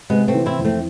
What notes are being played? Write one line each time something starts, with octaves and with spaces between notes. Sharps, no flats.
C3 G#3 B3
A3 C4
E3
C4 E4
F2
A3 C4